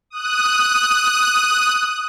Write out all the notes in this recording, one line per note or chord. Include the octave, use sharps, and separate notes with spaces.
D#6 F#6